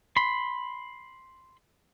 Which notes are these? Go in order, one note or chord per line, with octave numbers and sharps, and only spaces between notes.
B5 C6